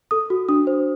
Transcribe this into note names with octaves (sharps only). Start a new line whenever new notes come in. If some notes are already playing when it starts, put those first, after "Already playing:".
A4 D#6
F#4
D4 D#6
C5